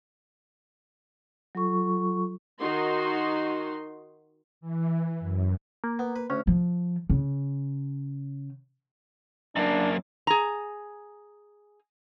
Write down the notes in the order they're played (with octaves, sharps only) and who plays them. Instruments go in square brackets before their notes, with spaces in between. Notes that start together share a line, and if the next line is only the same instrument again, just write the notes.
[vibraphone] F#3 F4 A4 C#6
[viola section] D#3 D#4 F#4 C6
[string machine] E3
F#2
[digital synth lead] A#3
[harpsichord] B3
B4
[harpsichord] D2 [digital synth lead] C#4
[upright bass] F3
C#3
[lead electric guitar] F#2 A#3 [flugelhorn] D4
[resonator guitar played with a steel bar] G#4 A#5